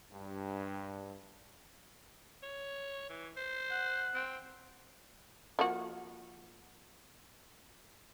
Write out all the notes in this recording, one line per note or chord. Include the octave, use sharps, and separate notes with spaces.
G2
C#5
E3
C5
F#5
C4
F3 A#3 F#4